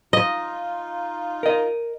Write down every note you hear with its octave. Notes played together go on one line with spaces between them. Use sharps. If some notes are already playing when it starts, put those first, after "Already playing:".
D#4 F4 D#5
A#4 D#5